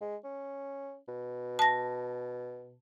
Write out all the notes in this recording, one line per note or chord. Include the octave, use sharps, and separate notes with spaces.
G#3
C#4
B2
A5 A#6